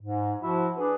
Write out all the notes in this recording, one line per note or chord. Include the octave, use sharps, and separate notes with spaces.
G#2
F3 E4 F#4
D4 G#4 B4